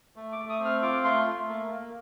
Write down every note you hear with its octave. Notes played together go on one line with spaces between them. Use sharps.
A3
D6
A3
D#6
C4
F6
F4 D6
A3 C6
A3
A#3
A#3